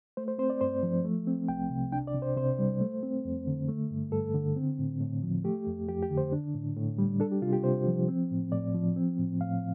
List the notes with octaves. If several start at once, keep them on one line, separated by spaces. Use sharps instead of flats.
A3 C5
C5
C4 C5
D5
G2 C5
F3
A3
C4
C2 G5
C3
D4 G5
D5
C3
C5
C3 C5
G3
A3
C4
F2
D3
A3
G2
G2 A4
D3
C4
A2
A2
F3
A3 G4
F2
F2 G4
G4
D3
C5
D4
A2
A2
G3
D4 A4
G4
C3 F4
G4
C3 C5
F3
C4
A2
A2 D5
F3
C4
A2
A2 F5